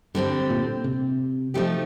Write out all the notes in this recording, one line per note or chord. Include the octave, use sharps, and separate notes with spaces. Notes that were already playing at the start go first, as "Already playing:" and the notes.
G2 D3 G3 C4 G4
A#2
C3
F3 A3 D#4 G4